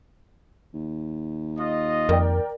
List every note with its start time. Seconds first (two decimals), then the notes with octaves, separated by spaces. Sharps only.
0.74 D#2
1.59 F4 D#5
2.09 F2 A#4 D5 G5